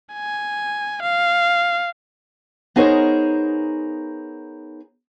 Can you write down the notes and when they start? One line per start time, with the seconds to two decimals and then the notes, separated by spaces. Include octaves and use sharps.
0.14 G#5
1.03 F5
2.76 B3 D#4 G#4 A#4 C5 C#5